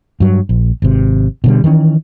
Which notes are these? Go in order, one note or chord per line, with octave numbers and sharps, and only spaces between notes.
G2 F#3
A#1
G#1 C3
B2 D3 G3
D#3 E3 G3 C#4